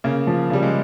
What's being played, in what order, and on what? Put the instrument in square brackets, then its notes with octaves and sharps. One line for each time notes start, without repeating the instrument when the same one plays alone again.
[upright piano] C#3 [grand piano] A#3
[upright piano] F3
[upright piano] C#3 [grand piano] G3
[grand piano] G#3